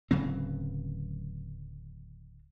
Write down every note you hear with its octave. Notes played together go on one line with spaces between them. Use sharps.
D1 C#3 F#3 C4